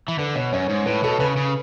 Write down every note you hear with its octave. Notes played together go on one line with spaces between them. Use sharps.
E3
D3 B4
B2 C#5
F#2 C#5
G#2
A2 B4
B2 A4
C#3 B4
C#3